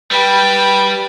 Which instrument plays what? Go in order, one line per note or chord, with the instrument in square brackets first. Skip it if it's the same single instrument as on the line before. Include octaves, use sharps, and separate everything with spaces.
[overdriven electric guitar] G3 [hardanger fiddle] B4 G5